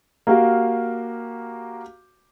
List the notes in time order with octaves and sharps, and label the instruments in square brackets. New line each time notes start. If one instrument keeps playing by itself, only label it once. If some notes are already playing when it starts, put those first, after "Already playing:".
[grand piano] A#3 F#4 G4 F5